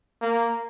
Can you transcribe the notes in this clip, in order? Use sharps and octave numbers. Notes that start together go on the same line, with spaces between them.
A#3